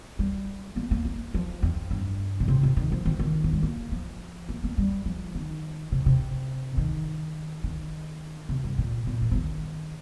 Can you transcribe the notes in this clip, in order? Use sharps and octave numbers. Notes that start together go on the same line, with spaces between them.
G3
A#3
A#3
A#3
F3
F2
G2
A#2
C3
C3
D#3
F3
D#3
D#3
F3
G3
A#3
F3
A#3
A#3
G3
F3
D#3
C3
C3
D#3
D#3
C3
G2
A#2
A#2
D#3
F3
D#3